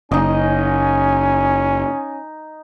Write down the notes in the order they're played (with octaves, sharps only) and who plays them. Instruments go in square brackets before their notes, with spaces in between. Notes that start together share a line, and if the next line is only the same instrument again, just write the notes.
[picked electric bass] F#1 [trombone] C#4 [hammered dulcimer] D#4 D#5 [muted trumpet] G#5